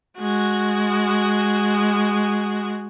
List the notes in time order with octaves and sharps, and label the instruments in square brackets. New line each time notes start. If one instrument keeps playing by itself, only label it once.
[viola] G#3 F#4